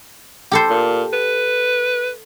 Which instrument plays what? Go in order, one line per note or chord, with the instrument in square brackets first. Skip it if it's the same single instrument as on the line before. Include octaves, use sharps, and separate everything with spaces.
[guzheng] G4 A4 C5
[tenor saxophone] A#2
B4